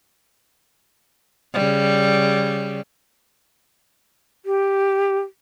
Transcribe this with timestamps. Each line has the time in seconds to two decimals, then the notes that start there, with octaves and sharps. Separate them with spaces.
1.54 C#3 G3
4.46 G4